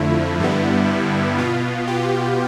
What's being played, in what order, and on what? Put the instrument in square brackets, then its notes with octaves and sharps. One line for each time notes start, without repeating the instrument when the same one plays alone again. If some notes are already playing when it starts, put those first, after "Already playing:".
Already playing: [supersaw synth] F2 D3 F3 A3 E4
G2 D3 G3 B3
B2 B3 F4
G4